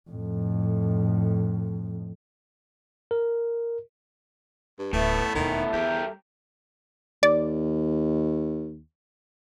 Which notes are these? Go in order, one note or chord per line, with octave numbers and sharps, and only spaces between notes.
F2 A2
A#4
G2
D1 A2 A3 B3 B4 E5
E1 D#2 D#3 A4 E5
E2 G3 G4 A#4
D#2 D5